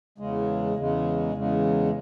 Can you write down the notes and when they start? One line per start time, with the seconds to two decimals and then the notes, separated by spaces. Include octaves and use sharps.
0.18 E2 C#3 G#3
0.76 E2 C#3 G#3
1.34 E2 C#3 G#3